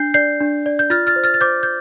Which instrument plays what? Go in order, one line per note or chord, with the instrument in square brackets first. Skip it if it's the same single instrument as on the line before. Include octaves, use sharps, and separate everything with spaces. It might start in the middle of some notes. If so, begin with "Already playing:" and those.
Already playing: [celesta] D4 G6 C7
D5 G6 C7
D4
D5
G6
F4 F6 A6
F6 A6
C5
F6 A6
A6
C5 D6 G6
G6